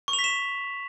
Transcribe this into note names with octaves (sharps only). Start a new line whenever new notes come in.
C#6
F7
B6
E7